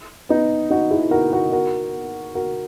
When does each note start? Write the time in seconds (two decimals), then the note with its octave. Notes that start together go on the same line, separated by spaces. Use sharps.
0.29 B3 D#4
0.71 D#4 F#4
0.91 E4 G#4
1.11 F#4 A#4
1.33 F#4 A#4
1.52 F#4 A#4
2.35 F#4 A#4